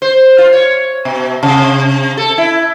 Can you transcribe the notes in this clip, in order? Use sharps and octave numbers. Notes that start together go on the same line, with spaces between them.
C5
F4
C#5
B2
C3
A4
E4